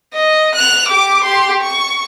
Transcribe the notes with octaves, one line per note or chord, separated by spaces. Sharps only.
D#5
F#6 F7
G4 D6
G4 C6
C#6